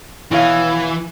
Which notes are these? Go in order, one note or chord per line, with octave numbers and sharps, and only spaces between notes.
B2 E3 C#5 F5